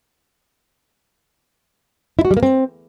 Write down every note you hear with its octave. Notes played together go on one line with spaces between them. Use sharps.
E4
F#4
G3
A#3
C4